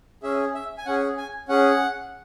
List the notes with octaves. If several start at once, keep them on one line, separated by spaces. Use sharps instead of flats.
C#4 G#4 E5
E5
G#5
C#4 G#4 F#5
G#5
C#4 G#4 F#5